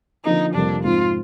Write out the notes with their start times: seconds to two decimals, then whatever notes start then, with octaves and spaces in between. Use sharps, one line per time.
0.25 D3 F3 A#3 D#4
0.54 F2 C3 G3 A#3 D4
0.84 G#2 F3 C4 F4